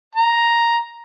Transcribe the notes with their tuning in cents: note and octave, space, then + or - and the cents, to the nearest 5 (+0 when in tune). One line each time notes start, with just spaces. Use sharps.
A#5 +5